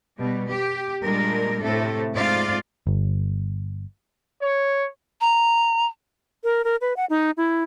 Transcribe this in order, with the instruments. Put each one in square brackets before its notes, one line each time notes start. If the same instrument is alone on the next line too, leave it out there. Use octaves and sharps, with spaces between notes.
[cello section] B2 G3
G4
A#2 G3 G#3 D4 A#4
A2 C3 A3 A4
G#2 A3 C4 F4 D5 F5
[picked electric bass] G1
[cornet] C#5
[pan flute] A#5
[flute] A#4
A#4
B4
F#5
D#4
E4